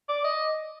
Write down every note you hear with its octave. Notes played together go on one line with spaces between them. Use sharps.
D5
D#5